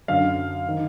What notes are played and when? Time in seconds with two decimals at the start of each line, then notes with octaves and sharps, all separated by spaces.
0.08 F#2 D3 F5
0.68 D#3